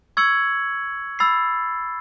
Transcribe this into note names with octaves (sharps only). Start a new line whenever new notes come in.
C#6 E6 G#6 C#7 F#7
B5 E6 A6 C7